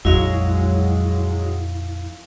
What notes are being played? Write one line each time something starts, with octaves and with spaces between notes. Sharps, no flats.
A#1 F2 F#3 G#3 E4 F#4 F5